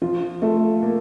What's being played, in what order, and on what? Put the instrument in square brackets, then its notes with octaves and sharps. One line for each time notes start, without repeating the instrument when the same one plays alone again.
[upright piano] F3 F4
A3 A4
A#3 A#4